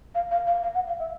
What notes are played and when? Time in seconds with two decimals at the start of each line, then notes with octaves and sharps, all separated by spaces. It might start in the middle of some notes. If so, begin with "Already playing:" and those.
0.15 F5
0.31 F5
0.47 F5
0.63 F5
0.75 F#5
0.87 F5
0.99 E5